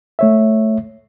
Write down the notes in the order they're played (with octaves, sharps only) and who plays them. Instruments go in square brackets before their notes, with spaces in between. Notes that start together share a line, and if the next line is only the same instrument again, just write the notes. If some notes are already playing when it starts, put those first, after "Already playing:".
[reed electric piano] A3 C#5 E5